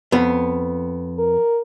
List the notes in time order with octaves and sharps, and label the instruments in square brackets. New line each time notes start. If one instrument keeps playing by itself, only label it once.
[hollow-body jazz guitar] F2 B3
[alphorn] A#4